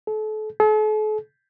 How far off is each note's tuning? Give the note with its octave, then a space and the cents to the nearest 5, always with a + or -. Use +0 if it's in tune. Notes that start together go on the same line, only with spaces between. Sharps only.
A4 -35
A4 -45